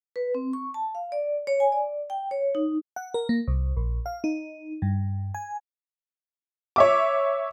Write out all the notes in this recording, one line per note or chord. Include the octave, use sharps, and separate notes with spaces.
B4
C4
C#6
A5
F5
D5
C#5
G#5
D5
G5
C#5
D#4
F#5
A#4
A#3
C2
A#1
F5
D#4
G2
G#5
C#5 E5 D6